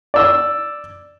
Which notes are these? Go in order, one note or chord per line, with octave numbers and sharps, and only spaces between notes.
D5 E6